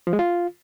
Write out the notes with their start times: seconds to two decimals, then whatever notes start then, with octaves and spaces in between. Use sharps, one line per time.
0.07 F3
0.13 G#3
0.19 F4